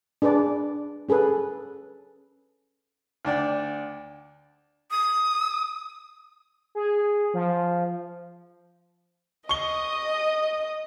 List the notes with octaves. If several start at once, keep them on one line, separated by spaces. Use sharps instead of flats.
D4 G#4 B4 D5
C#4 G#4 A4 B4
D2 D4 D5 G5
D#6
G#4
F3
D#5 C#6 D#6 G7